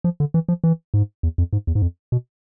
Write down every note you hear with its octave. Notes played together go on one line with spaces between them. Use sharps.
F3
D3
E3
F3
E3
G#2
E2
F2
G#2
E2
G#2
F2
B2